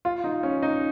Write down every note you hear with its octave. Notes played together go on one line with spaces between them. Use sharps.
F4
D#4
C#4
D#4